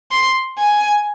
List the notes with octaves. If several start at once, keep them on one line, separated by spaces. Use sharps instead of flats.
C6
G#5